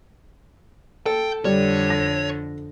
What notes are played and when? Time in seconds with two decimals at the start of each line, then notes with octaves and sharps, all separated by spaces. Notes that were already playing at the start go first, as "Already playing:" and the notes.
1.06 A4 G5
1.45 F2 D3 G3 C#5
1.90 A#6